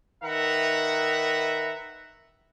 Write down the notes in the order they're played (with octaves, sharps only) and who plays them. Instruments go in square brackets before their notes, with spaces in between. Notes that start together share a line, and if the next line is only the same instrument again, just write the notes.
[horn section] D#3 B4 E5 F#5 A#5